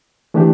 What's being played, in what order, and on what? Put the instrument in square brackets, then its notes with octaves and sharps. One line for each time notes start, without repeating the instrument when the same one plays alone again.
[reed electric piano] E3 A3 D4 G4